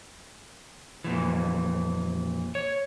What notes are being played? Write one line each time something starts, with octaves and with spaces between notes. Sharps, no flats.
F2 A#2 E3
C#5